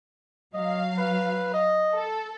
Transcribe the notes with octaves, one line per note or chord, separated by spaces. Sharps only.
F#3 D#5 F5
B4
D#5
A4